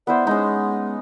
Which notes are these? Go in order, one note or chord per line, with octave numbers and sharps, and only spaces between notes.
B3 E4 C5 D5
G#3 C#4 D#4